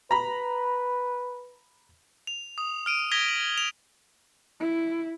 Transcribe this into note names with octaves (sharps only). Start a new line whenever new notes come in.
B4 A#5 B5
F7
D#6
F6 D7 D#7
D#6 G#6 A#6 B6 F7 G7
F#7
F7
E4